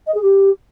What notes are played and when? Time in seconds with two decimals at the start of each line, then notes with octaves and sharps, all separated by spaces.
0.06 D#5
0.14 G#4
0.22 G4